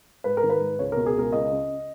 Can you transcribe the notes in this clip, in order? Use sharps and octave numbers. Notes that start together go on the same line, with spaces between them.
G#2 B4
A#4
D#3
B4
G#2
C#2 C#5
B2 A#4
G#4
C#2 A#4
C#2 D#5
C#3